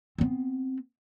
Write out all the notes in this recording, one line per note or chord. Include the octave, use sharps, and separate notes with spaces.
B3 C4